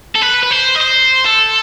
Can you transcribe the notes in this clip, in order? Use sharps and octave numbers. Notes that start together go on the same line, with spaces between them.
A4
B4
B4
C5
D#5
C5
A4